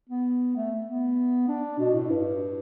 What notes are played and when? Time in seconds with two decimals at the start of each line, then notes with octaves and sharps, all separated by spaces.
0.09 B3
0.56 A3
0.86 B3
1.48 D4
1.79 B2
1.94 A2
2.10 G2